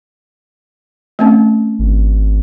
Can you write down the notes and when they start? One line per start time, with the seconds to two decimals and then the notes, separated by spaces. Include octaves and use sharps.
1.19 A3 C4 C#4
1.79 G#1